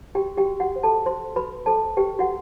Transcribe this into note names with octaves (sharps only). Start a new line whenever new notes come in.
F#4 G4 G5
G4 G5
F#4
F#4 F#5
C5
A4 A5
F#4 C5 C6
F#4 B4 B5
A4 C5 A5
G4 B4 G5
F#4 F#5